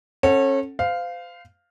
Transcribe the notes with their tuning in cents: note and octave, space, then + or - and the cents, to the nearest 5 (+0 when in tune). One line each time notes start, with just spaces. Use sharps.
C#4 -30 A4 +5 F#5 +0
C5 -35 F5 +0